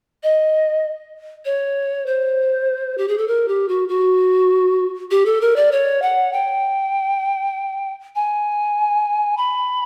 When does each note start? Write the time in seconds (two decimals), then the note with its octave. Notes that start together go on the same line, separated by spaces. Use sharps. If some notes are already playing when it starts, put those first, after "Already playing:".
0.23 D#5
1.45 C#5
2.06 C5
2.98 G4
3.08 G#4
3.18 A4
3.28 A#4
3.48 G4
3.68 F#4
3.89 F#4
5.11 G4
5.26 A4
5.41 A#4
5.56 D5
5.72 C#5
6.02 F#5
6.33 G5
8.15 G#5
9.37 B5